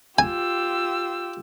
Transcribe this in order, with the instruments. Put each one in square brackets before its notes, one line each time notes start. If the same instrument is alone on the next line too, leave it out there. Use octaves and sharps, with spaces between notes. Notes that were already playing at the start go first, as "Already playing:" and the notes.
[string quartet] F4 G4 E6 [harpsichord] G#5